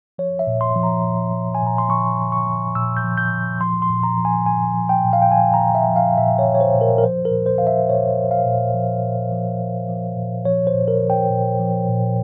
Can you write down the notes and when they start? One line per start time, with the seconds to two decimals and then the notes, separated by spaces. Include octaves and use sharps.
0.18 F3 C#5
0.39 E5
0.47 A#2
0.61 C6
0.75 F3
0.83 A#5
1.04 A#2
1.33 F3
1.55 G#5
1.62 A#2 A#5
1.78 C6
1.89 F3 C#6
2.18 A#2
2.32 C#6
2.47 F3
2.75 A#2 E6
2.97 G6
3.04 F3
3.17 G6
3.32 A#2
3.61 F3 C6
3.82 C6
3.89 A#2
4.03 A#5
4.17 F3
4.25 G#5
4.46 A#2 G#5
4.74 F3
4.89 G5
5.04 A#2
5.13 F5
5.22 G5
5.31 F3 G#5
5.54 A#5
5.61 A#2
5.75 E5
5.88 F3
5.96 F5
6.18 A#2 E5
6.39 C#5
6.46 F3
6.55 C#5
6.61 C5
6.75 A#2
6.81 A#4
6.98 A#4
7.04 F3 C5
7.25 A#4
7.31 A#2
7.46 C5
7.58 F3 F5
7.67 E5
7.89 A#2 C#5
8.18 F3
8.31 F5
8.46 A#2
8.74 F3
9.03 A#2
9.32 F3
9.60 A#2
9.89 F3
10.16 A#2
10.45 F3 C#5
10.67 C5
10.74 A#2
10.88 A#4
11.03 F3
11.10 G5
11.31 A#2
11.60 F3
11.89 A#2